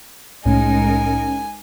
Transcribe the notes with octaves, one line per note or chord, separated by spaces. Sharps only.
C2 A2 G#3 C#4 D#4 A#4 G#5